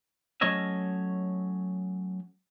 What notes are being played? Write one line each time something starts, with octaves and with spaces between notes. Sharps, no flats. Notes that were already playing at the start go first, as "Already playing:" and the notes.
F#3 A3 C#4 C#5 D#5 E5